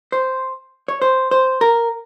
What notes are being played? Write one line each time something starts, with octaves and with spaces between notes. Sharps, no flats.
C5
C#5
C5
C5
A#4